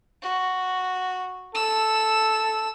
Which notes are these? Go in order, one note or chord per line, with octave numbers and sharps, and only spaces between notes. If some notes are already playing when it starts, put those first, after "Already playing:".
F#4
A4 E6